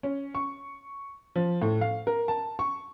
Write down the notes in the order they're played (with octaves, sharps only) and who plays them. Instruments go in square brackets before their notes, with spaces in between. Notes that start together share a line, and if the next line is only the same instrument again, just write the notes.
[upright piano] C#4
C#6
F3
A2
F5
A#4
A5
C#6